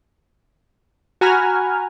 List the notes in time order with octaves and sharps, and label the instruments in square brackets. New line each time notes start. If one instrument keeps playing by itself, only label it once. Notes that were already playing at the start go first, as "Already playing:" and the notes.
[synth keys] F#4 G#5 A#5 B5 F6